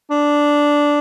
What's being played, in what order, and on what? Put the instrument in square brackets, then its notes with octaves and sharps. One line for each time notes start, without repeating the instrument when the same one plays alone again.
[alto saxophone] D4